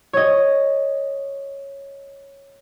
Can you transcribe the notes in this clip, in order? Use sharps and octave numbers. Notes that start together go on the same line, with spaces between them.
C#5 D#5